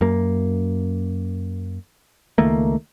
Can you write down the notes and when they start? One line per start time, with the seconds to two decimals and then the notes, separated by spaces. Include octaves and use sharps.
0.01 F#2 A#3
2.38 C#2 D#3 A3 A#3